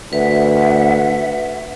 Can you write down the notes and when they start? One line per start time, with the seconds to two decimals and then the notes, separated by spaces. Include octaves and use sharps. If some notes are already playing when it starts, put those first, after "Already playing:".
0.13 D2 B4 E5 F#5